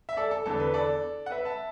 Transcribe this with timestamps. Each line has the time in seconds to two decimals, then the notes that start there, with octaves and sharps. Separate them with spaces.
0.09 E5
0.17 A4 D5
0.31 A4
0.46 E2 D3 A4
0.60 B4
0.74 A4 D5
1.26 F#5
1.31 B4 E5
1.45 E5 A5